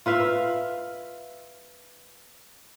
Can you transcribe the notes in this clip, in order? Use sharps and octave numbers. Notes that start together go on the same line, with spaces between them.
F4 B4 E5 F5